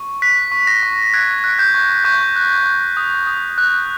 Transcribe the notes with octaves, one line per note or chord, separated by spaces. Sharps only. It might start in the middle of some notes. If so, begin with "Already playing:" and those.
Already playing: C#6
F#6 B6
C#6
A#6
C#6
F#6 G#6
F#6
G6
C#6
C#6 G6
F#6
F#6
D#6
D#6
F#6